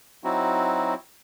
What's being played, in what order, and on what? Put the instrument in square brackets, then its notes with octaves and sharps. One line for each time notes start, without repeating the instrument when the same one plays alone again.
[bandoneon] F#3 C4 D#4 E4 F#4